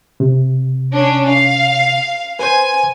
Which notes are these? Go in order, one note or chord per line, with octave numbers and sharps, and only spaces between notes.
C3
C#4 D4
F5
B4 C5 G#5